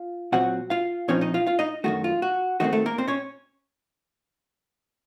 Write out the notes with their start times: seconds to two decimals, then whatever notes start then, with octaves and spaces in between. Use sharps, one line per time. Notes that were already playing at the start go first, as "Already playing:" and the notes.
Already playing: F4
0.32 A#2 F#3 C4 F#4 F#5
0.70 F4 F5
1.08 A#2 F3 C4 C#4 D#4 C#5
1.21 D#4 D#5
1.34 F4 F5
1.47 F4 F5
1.59 D#4 D#5
1.84 F#2 D#3 A3 F#4
2.04 F4
2.22 F#4
2.60 D#2 D#3 A3 C4 F#4
2.73 A3 A4
2.86 A#3 A#4
2.98 C4 C5
3.08 C#4 C#5